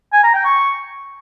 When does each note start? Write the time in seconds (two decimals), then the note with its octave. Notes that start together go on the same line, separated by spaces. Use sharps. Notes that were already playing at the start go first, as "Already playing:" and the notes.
0.13 G#5
0.24 A#5
0.34 G5
0.45 C#6